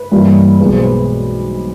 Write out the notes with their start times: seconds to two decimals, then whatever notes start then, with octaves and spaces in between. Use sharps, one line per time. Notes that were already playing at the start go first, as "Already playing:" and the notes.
Already playing: B4
0.12 G2 E3 G3 A#3
0.59 B1 B2 G#3 B4
0.72 C5
0.83 B4